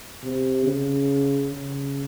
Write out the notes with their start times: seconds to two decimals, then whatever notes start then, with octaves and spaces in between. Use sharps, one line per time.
0.23 C3
0.65 C#3
1.51 C#3